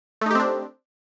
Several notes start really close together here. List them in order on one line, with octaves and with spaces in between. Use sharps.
A3 D#4 G4 C4 D4